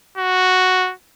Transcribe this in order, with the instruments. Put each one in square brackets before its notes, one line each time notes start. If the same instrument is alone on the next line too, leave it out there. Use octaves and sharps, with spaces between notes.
[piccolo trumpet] F#4